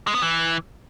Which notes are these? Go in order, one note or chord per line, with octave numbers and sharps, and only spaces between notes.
G#3
B3
E3